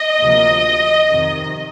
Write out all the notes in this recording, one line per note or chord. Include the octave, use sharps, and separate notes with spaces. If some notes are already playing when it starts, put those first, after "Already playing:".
Already playing: D#5
D2 C3 F3 A#3
F2 C3 D#3